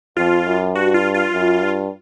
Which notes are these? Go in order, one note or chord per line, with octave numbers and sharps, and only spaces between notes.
F2 F4
F#2
G2 F#4
F4
F4
F#2
G2